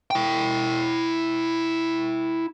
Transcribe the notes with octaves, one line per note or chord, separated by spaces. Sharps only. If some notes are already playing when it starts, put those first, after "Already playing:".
E4 G5